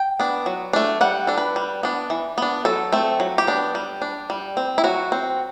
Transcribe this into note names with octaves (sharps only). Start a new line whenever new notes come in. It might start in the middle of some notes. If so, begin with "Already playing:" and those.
Already playing: G5
B3 D4
F#3
A3 D4
G3 F#5
D4 A4
B4
G3
B3 D4
E3
B3 D4
F#3 A4
A3 C4
F#3
G4
B3 D4
G3
D4
G3
C4
E4
F#3 F#4
C4